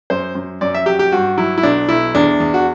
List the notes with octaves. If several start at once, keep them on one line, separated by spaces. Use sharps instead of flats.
F#2 C5
F#2
F#2 D5
E5
F#3 G4
G4
G2 F#4
F#3 E4
E4
B1 D4
B1 E4
E2 D4
E2
F#4